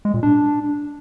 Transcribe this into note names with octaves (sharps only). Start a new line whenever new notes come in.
G#3
A#2
D4